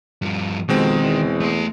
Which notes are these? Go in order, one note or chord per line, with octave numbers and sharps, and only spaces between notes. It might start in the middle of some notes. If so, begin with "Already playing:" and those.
G2 F3
F2 B2 D#3 G#3 C4
E2
A3 C6